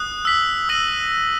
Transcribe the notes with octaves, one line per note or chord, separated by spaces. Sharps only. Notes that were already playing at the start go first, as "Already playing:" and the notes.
Already playing: D#6 F#6
E6 B6 F#7
E6 A#6 D#7 F#7